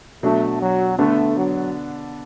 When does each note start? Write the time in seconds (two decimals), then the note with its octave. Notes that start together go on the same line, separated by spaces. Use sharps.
0.23 B2 F#3 A3 D4
0.61 F#3
0.98 D3 A3 B3 D4
1.37 F#3